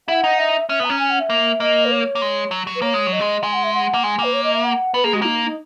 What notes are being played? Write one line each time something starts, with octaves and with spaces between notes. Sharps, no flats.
E4 F#5
D#4
E5
C#4 E5
B3 A#5
C#4
G#5
F#5
E5
A#3
A#3 D#5
B4
C#5
A#3
G#3
F#3
F#3
B4
A#3 C#5
G#3
F#3
D#5
G#3
G#3 G#5
F#5
E5
F#5
A#3
G#3 G#5
A#3 B4
C#5
D#5
E5
F#5
B3 B4
A#3 G#4
G#3 F#4
A#3 D#4
D#4